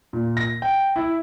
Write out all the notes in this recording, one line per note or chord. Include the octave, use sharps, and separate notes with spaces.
A#2
A#6
G5
E4